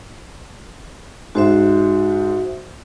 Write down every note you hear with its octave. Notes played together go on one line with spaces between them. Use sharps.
G#2 F#4 C5 E5